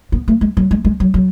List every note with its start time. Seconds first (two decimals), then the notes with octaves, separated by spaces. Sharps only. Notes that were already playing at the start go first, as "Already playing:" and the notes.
0.12 B3
0.28 A3
0.41 G#3
0.57 F#3
0.71 G#3
0.85 G#3
1.00 F#3
1.14 F#3